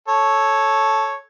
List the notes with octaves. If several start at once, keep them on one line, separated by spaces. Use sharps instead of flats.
A4 C#5